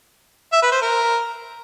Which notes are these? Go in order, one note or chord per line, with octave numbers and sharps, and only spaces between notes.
E5
B4
C5
A#4